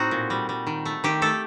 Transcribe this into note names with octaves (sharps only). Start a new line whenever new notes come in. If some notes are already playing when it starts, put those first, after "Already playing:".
Already playing: A2 C4 D#4 F#4
A#2
G3
G3
D#3
A3
D#3 G4
A3 A4